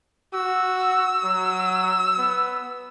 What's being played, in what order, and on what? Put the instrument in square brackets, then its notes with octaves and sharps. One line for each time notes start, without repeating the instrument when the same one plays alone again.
[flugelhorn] F#4 [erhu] E6
[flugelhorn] F#3
B3